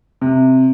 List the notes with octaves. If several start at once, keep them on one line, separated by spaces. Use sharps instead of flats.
C3